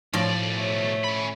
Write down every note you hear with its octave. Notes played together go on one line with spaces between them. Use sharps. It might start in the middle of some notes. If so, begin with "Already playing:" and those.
B1 A2 F3 D5
A3 C#5
C#4 B5